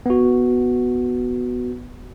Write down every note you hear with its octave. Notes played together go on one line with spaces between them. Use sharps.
B3 F#4